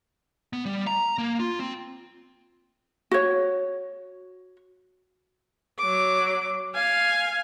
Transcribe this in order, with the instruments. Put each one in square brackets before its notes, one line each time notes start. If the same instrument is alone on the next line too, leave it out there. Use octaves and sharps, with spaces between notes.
[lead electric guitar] B3
G3
A#5
A#3
F4
C4
[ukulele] F#4 C#5
[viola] F#3 D6
F5 G#5